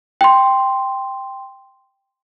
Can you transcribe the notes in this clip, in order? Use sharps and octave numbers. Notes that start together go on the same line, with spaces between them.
G5 C6